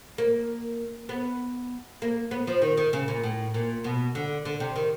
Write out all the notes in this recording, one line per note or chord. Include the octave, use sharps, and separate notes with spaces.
A#3
B3
A#3
B3
F3
D#3
D#3
C#3
A#2
A2
A#2
B2
D3
D3
C3
D#3